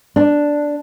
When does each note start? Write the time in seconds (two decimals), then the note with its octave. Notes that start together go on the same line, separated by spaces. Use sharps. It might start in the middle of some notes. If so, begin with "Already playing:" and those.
0.16 D4